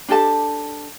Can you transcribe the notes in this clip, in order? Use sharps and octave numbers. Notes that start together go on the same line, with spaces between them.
D4 G4 A4 A5